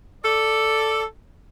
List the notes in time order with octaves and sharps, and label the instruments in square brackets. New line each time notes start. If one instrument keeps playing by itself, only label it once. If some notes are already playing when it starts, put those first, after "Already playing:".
[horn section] A4 D5